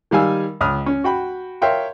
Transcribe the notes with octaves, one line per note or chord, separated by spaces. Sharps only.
D#3 G3 F5 G#5 E6
C#2 D#6 F6
C#4
F#4 G5 B5
A#4 C#5 E5 F5 G5 C6